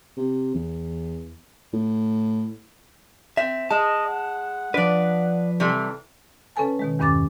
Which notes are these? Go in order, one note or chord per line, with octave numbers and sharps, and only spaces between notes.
C3
E2
A2
C4 E5
G#3 D#5 A5
F#5
F3 D4 B4 D5
C3 E3 G3 A4
C#3 C#4 A4 B4 G#5 A5
B2 D#3 G#3
E2 G2 D#3 C#4 D6 A6